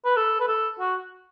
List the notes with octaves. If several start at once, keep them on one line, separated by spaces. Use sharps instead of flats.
B4
A4
B4
A4
F#4